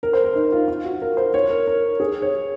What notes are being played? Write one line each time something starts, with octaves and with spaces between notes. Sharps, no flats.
A#4
C5
A#4
D#4
F4
F4
F#4
A#4
C5
C#5
A#4
A#4
G#4
C#5